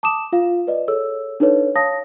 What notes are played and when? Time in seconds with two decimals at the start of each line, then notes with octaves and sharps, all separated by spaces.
0.03 A5 D6 D#6 E7
0.32 F4 F5
0.67 B4 D5 D#5
0.88 G#4 A4 C#5 E6
1.40 D4 D#4 A4 B4 C#5
1.75 C#5 F5 A5 D#6 A#6